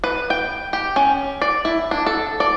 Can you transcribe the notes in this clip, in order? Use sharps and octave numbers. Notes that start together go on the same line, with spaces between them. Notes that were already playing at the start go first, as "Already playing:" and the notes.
B4
G5
G4
C#4
D5
E4
D4
A4
D5